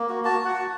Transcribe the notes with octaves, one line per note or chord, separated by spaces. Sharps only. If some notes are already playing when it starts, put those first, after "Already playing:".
Already playing: A#3
F#4
F#4 A5
F#4
F#5
F#4